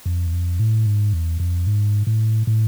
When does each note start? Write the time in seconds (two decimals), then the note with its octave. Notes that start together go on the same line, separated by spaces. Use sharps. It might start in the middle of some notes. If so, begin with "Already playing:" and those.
0.06 F2
0.27 E2
0.33 F2
0.60 A2
0.86 G#2
1.13 E2
1.40 F2
1.67 G#2
2.07 A2
2.47 A2